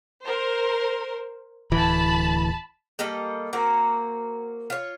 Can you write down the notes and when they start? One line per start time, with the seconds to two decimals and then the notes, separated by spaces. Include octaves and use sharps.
0.22 A#4 C5
1.72 D1 E3 A5 B5
2.99 G3 A#3 A4 D#5
3.53 A#3 C4 F#4 A#4
4.70 F4 C#5